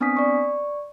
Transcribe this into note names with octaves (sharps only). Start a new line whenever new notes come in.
B3 C4 D4 G#5 D#6 B6
D5 C#6